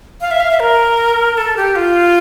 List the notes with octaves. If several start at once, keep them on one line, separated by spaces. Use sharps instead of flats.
F5
E5
F5
E5
A#4
A4
G4
F4